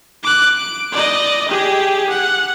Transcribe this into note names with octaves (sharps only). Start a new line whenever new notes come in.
D6 F#6
D7
D5 D#5
G4 G#4
F#5